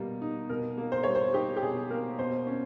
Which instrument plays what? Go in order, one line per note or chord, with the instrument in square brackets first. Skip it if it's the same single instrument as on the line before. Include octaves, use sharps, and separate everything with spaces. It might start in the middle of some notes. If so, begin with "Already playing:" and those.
Already playing: [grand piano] B2 G3 A#3
D#4
[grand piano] B2 [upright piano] A#4
[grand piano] A#3
[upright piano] C5
[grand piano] G3 [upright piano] C#5
[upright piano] C5
[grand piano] D#4 [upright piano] G4
[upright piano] G4
[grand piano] B2 [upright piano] G#4
[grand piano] A#3 [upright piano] A#4
[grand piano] B2 [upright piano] C5
[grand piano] C#4